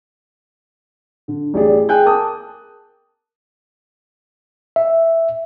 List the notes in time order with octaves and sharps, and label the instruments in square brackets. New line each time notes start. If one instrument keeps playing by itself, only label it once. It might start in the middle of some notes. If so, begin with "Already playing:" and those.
[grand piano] D3
A1 G4 G#4 D5
G#4 G5 G#5 F#6 G6
A#4 A5 D6 D#6
[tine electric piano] E5